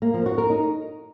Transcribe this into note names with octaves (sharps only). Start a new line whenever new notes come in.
A#3
F3
F#4
A#4
D#4